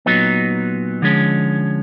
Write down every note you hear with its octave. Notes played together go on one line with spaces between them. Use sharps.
A#2 F#3 B3 D#4
D3 F3 G#3 C#4